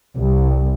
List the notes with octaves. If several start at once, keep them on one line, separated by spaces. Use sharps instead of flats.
C2